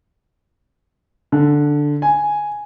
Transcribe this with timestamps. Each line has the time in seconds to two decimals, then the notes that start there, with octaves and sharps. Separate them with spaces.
1.32 D3
2.02 G#5